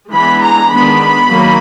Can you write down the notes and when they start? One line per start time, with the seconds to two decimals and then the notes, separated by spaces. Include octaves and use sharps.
0.12 E3 G#3 B3 D4 B5
0.41 A#5
0.70 D#3 G#3 B3 D4 B5
1.27 D#3 F#3 A#3